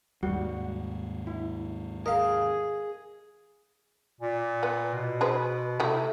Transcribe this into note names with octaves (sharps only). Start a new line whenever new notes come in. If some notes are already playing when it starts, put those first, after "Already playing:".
D#2 G#2 G3 F#4
E4
G#4 A#4 D#5 F5
A#2
B3
B2
G#4 B4 C5
C3 A3 E4